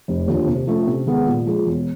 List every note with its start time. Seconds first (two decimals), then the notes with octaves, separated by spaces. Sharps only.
0.08 F1
0.27 D#2 D3 F3
0.47 C3
0.67 F3 A3 C#4
0.87 C3
1.06 D#3 G#3 B3
1.26 A#2
1.47 F3 G#3
1.66 E1